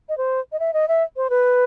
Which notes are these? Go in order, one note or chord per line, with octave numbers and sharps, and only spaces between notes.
D#5
C5
D#5
E5
D#5
E5
C5
B4